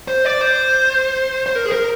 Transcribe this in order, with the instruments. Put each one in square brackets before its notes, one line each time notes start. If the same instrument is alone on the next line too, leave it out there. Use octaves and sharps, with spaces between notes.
[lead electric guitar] C5
D5
C5
C5
A#4
G#4
A#4